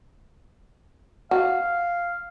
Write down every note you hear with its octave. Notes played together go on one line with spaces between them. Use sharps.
F#4 F5